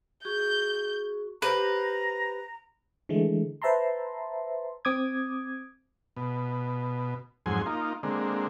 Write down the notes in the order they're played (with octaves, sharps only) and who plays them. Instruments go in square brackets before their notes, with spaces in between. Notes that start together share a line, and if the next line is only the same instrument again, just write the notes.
[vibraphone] F#4 G#4 C#6 [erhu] G6
[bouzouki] G4 C5 F5 [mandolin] B4 [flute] A#5
[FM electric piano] D3 E3 G#3 A3
B4 C5 E5 A5 A#5 C6
C4 D6 D#6 G#6
[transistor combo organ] B2
F2 G#2 F#3 G#5 C6
A#3 D#4 F4
D3 G#3 A#3 C4